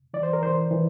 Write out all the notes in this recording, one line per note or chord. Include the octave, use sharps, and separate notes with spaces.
E3 D5
C5
A#4
E3 C5
E3